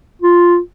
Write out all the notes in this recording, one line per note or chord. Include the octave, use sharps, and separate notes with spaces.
F4